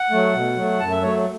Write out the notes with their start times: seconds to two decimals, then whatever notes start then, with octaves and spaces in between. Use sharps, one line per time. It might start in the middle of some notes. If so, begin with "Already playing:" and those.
Already playing: F#5
0.10 F#3 A3
0.34 B2
0.57 F#3 A3
0.79 F#2 A5
0.91 E5
1.02 F#3 A3 C#5